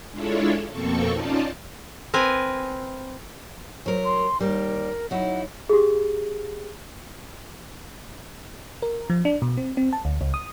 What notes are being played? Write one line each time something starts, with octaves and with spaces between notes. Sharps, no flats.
G#3 D4 E4 F4 A4 C#5
F2 B2 A#3 C4 A4 C#6
C#4 D#4 F4 D5 A5
C4 A#4 B4 G#5
F#3 A#4 C5
C6
D#2 G3 A#4
F#3 D#4 E4 F#5
G4 G#4
A#4
F3
D4
B2
C4
C4
A5
D2
C#2
D#6